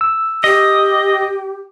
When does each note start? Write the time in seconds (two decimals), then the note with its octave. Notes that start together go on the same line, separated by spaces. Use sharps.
0.01 E6
0.44 G4 D#5